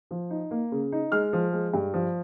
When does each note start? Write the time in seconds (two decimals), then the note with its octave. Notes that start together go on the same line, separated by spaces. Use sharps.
0.11 F3
0.30 D#4
0.51 A#3
0.72 C#3
0.92 D#4
1.12 G#3 F6
1.33 F3
1.53 G#3
1.73 G2
1.94 F3